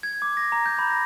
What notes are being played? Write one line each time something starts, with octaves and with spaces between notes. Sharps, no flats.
G#6
D6
A#6
A#5
G6
B5
A#6